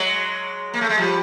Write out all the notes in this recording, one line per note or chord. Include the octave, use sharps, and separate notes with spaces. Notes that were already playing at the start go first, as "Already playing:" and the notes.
Already playing: F#3 G#3
A#3
A3
G#3
F3 G3